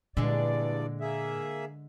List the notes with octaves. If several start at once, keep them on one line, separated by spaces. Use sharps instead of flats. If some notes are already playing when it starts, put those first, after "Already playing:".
E2 G2 A#2 D3 G#3 D5
A#3 G#4 E5